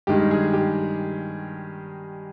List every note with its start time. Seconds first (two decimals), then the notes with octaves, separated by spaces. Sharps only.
0.07 G2 D#3 G#3 G4
0.31 G#4
0.53 G4